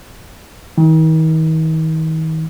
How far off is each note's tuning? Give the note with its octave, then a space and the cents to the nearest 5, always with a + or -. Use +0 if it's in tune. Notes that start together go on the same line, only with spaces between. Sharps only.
D#3 +40